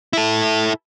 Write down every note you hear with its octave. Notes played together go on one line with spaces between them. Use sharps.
E4 A4